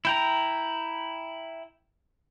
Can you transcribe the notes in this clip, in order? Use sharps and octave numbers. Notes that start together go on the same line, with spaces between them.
E4 G5 A#5